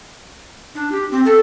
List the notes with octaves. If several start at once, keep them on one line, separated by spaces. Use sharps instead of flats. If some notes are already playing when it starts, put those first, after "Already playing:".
D4
G4
C4
A4